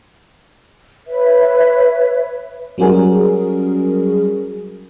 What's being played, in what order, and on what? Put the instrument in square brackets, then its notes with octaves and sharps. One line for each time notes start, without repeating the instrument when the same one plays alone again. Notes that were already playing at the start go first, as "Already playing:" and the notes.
[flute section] B4 C#5 E5
[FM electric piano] F#3 G3 C#4 F#4 G#4 A#4